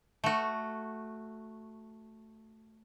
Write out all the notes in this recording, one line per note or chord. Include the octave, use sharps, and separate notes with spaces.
A3 F#4